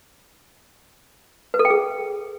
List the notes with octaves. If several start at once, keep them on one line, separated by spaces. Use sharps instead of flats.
B4
A4
G5
G#4